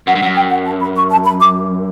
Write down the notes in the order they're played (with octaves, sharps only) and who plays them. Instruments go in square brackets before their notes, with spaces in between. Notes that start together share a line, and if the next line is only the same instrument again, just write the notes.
[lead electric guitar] F#2 [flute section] F#5
[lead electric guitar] G2
[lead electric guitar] F#2 [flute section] F#5
[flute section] G5
F#5
A5
B5
C#6
A5
B5
D6